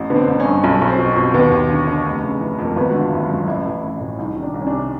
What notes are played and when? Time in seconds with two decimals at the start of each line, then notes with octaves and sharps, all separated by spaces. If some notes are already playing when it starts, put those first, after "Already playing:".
Already playing: A1
0.10 D3 B3
0.16 C4
0.28 A1
0.40 C#4
0.45 G2
0.63 B1 C#4
0.82 B1
0.87 C4
0.99 B2
1.10 C4
1.16 B2
1.34 D#2 B3
1.52 D#2
1.70 D3
1.87 D3
2.06 F1
2.24 C#3
2.40 E3
2.58 F2
2.65 A#3
2.76 G#1 B3
2.89 D3 F#4
3.01 F4
3.12 G#1 E4
3.23 F4
3.30 F#2
3.48 A1 E4
3.66 E3
3.83 A1 E4
4.01 A2
4.18 C2 D#4
4.36 D#3
4.43 D4
4.54 C2
4.61 C#4
4.67 D4
4.72 C3